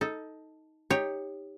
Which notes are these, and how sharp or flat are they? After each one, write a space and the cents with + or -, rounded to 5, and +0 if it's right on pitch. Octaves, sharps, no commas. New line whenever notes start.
D#4 +15 A4 +0
D#4 +0 G4 +15 C#5 +0